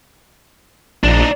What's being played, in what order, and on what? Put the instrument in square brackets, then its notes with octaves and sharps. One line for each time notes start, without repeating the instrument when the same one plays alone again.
[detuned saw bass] A#1 [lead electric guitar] D4 D#4